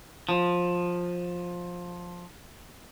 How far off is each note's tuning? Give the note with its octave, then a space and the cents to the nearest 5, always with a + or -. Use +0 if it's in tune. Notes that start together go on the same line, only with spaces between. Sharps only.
F3 +15